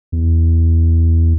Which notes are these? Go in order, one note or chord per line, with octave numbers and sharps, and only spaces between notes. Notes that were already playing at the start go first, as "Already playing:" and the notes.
E2